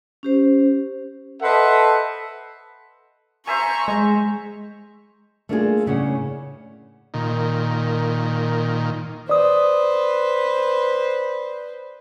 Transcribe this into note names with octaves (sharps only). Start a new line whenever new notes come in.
C#4 G4 C5
A4 B4 C5 D#5 E5 F#5
C5 E5 G#5 A#5 C#6
G#3
A3 A#3 D4 F4 F#4 G#4
A2 C#3 C#4 D4 F#5
A#2 D#3
B4 C5 D5 D#6